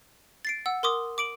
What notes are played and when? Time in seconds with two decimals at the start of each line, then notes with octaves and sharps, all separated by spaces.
0.45 A6 C7 D7
0.66 F#5 E6
0.83 A#4 C6 D6 D#6
1.18 D6 D7 F#7